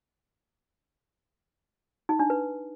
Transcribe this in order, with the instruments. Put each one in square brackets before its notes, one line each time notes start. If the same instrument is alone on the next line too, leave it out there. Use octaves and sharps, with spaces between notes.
[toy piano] D#4
D4
B4